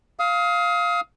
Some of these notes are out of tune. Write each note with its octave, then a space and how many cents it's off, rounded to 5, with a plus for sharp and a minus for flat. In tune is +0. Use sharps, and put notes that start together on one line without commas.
F5 +0 D#6 +30